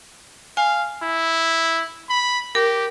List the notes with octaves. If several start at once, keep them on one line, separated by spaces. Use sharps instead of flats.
F5 G#5
E4
B5
G4 A#4